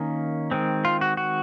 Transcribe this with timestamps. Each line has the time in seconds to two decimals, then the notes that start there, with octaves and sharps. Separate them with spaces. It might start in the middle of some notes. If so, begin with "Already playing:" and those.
Already playing: D#3 A#3 C#4
0.51 D#3 G#3 C4
0.85 F4
1.01 F#4
1.17 F#4